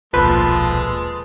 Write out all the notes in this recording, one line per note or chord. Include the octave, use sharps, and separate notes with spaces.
D#1 B1 A#2 F3 G#3 A4 B4